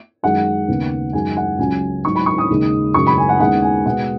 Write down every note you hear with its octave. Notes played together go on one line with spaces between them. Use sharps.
F#2 D#3 G#3 F#5
D#2 C#3 B3
F#2 D#3 G#3 G#5
F#5
C#2 C#3 F#3 C#4 G#5
G#2 F#3 D#4 C#6
B5
C#6
D#6
D#2 C#3 G#3 D#4
F#2 C#3 G#3 C#6
B5
G#5
F#5
D#2 C#3 G#3 B3 D#4 F#5
G#5
B2 G#3 B3 F#5